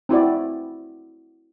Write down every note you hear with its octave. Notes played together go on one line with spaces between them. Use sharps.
C4 E4 F#4 D5